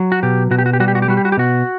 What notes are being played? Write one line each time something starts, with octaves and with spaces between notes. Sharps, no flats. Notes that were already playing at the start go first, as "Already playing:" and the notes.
Already playing: F#3
F#4
B2 G4
B2 F#4
G4
F#4
G4
G3 F#4
G4
F#4
G4
G3 F#4
G4
F#4
G4
B2 F#4